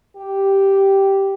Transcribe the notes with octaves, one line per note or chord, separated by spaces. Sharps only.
G4